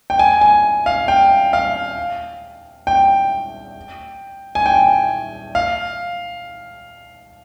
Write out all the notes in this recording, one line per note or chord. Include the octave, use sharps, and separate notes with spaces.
G5
G#5
G#5
F5
G5
F5
G5
G#5
G5
F5